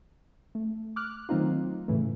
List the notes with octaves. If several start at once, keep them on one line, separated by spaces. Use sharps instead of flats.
A3
D6 F6 F#6
D#3 F#3 A3 C4 D#4 F4
A2 C#3 E3 A3